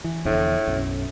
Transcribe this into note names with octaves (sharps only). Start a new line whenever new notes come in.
E3
F1 E2 A2 D3
B1 F#2